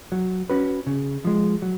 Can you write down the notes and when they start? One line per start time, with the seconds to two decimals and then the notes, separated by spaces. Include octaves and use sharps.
0.12 F#3
0.50 C#4 F#4 B4
0.87 C#3
1.25 F3 G#3
1.62 F#3